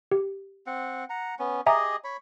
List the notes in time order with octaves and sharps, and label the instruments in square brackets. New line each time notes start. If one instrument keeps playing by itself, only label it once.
[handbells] G4
[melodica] C4 F#5
F#5 A#5
B3 C#4
[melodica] G4 G#4 D#5 [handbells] E5 G#5 A#5
[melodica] C#5 B5